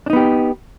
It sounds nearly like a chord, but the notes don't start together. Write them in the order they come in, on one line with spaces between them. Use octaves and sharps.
D4 D#4 B3 G4